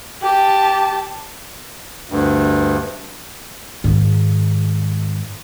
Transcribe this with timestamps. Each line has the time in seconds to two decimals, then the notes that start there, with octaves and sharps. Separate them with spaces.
0.22 G4 A5
2.10 D2 G2
3.84 G#2 D#3